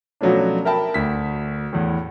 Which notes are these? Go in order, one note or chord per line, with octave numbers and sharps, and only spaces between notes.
B2 F3 F#3 A3 C#4 D4
A#4 E5 G5 A5 B5
D2 B6
E2 A2